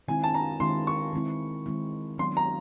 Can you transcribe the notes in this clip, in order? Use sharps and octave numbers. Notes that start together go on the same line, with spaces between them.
D#3 G#3 C4 E4 G#5
A5
A#5
D#3 G#3 C4 E4 C6
C#6
D#3 G#3 C4 E4
D#3 G#3 C4 E4
D#3 F#3 B3 D4 C6
A#5